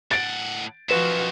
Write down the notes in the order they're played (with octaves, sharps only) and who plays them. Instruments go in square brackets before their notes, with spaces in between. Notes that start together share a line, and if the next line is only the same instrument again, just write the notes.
[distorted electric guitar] A2 F#5 [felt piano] A6 D7
[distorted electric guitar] F#2 D#3 [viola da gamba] F3 F#4 [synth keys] B4 E7